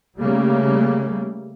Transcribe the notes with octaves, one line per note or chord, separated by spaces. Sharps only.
C#3 G3 A3 A#3